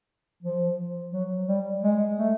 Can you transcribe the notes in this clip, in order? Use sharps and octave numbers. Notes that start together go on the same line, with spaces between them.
F3
F#3
G3
G#3
A3